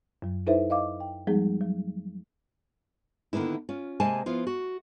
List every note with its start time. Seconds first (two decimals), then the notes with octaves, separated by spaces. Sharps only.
0.22 F#2 F#3
0.47 D#4 E4 A4 B4 C5 E5
0.70 D#5 F5 D6
1.00 G5
1.27 F3 G3 G#3 B3 D#4 G#4
1.61 F#3
3.33 D3 D#3 A#3 B3 E4
3.69 C#4 F4
4.00 C3 G#3 A#3 G#5 A5
4.26 F3 B3 E4 F4
4.47 F#4